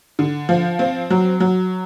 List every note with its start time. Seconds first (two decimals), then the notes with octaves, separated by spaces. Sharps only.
0.19 D3
0.49 F3
0.79 C4
1.10 F#3
1.40 F#3